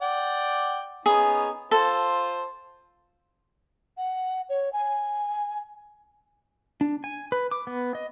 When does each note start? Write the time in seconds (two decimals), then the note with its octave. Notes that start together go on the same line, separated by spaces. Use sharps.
0.02 D5 F#5 G5
1.06 B3 C#4 D#4 G#4
1.71 F4 A4 C5
3.97 F#5
4.49 C#5
4.73 G#5
6.81 D4
7.04 G#5
7.32 B4
7.51 D6
7.67 B3
7.95 D#5